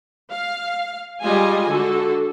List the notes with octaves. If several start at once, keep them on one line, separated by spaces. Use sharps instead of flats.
F5
G3 G#3 F4 D#5 G#5
D3 F#4 A4